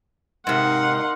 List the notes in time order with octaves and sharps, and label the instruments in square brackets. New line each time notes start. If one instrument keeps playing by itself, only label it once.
[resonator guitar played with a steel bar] G#2 C3 [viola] D#4 F#5 [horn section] A#4 F5 C6